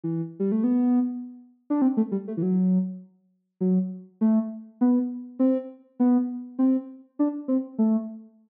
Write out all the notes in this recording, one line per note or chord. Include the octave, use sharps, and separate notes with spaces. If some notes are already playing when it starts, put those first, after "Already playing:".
E3
G3
A3
B3
D4
C4
A3
G3
A3
E3
F#3
F#3
A3
B3
C4
B3
C4
D4
C4
A3